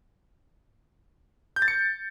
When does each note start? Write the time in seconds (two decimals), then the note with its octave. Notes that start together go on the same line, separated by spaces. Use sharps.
1.56 G6
1.62 A6
1.68 C#7